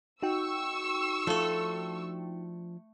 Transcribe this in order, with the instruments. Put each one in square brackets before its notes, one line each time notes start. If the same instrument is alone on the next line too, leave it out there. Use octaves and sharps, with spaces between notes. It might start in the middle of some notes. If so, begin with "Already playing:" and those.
[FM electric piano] D#4 F#4 G5 [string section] C#6 E6
[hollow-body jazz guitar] F3 D4 F4 [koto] A3 A4